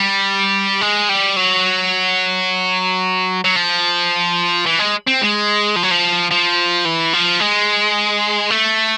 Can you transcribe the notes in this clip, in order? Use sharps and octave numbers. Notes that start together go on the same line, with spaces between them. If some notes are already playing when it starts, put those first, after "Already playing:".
Already playing: G3
G#3
G3
F#3
F#3
F3
E3
G#3
C4
G#3
F3
F#3
F3
F3
E3
F3
G#3
A3